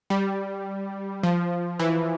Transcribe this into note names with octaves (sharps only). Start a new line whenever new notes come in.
G3
F3
E3